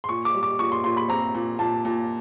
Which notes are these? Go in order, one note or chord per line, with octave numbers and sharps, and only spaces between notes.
C6
A#2 C#6
D6
G3
D6
A#2 C#6
C6
A#2 C6
B5
C4 A#5
A#2
A#2 A5
A#2